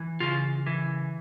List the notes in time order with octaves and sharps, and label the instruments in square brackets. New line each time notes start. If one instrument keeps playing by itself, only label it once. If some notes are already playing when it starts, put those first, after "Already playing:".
Already playing: [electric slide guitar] E3
C#3 F4
E3